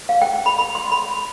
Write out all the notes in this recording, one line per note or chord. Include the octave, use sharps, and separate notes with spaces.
F5
G5
B5
B5
C6
B5